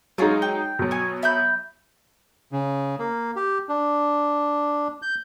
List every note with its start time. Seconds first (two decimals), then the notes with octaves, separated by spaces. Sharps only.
0.18 F#3 G#3 D#4 F4 F#4 G#4
0.42 G5
0.79 B2 F#3
0.91 C#5 G#5
1.23 E5 B5 G6
2.52 C#3
2.99 A#3
3.36 G4
3.69 D4
5.02 G6